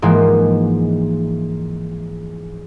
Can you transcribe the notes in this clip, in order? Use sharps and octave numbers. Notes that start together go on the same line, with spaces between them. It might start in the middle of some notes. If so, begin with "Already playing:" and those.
G#2 E3 F3 G#3 A#3